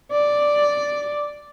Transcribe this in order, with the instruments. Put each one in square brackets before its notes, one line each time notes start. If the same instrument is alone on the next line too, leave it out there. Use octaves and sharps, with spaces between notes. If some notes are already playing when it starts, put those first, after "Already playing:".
[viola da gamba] D5